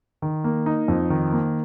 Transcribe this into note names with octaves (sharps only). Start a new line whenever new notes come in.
D#3
A#3
D#4
F2
D#3
A#3